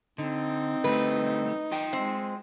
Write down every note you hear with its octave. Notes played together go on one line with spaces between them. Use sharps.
D3 C4 D#4
D3 G3 A3 B4
F4 D#5 G5
G#3 C4